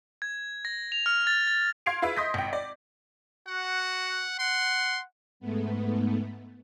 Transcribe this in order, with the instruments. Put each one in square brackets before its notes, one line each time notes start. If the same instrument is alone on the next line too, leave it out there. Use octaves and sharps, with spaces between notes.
[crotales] G#6
A#6
F7
F6
A6
A6
[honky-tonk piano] F5 C6 G#6 C7 D7 F7
F4 G#4 B4 E5
D#5 C6 D#6 G6 A#6 B6
G#1 G5
D5
[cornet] F#4 [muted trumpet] F#5
[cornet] F#5 [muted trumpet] C6
[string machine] G#2 A3 B3